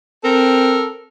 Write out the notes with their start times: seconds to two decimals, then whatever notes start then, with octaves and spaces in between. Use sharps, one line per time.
0.24 C4 A4 A#4